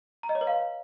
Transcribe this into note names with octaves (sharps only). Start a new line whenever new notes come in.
A#5
D#5
C#5
B4
F5